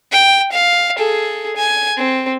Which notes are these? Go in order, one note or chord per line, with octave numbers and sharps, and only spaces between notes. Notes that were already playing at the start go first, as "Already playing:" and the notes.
G5
F5
G#4 A4
G#5
C4